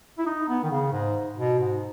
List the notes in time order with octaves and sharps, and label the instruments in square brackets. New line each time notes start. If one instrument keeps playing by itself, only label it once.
[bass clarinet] E4
D#4
B3
D#3
C#3
G#2
B2
G#2